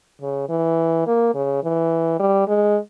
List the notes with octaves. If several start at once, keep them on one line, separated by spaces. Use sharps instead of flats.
C#3
E3
A#3
C#3
E3
G3
G#3